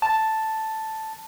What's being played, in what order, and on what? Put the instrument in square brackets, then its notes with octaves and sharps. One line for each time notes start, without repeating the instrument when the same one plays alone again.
[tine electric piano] A5